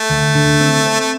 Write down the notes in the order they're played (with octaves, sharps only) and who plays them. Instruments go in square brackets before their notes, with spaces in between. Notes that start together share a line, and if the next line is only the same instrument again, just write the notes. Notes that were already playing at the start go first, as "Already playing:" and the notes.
Already playing: [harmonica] A3
[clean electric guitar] D2
D3
C4
C4
[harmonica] A3